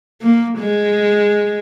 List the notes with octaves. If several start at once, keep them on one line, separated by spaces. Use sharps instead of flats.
A#3
G#3